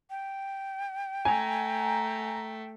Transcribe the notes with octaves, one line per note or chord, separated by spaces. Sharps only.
G5
A3 G#5 A#5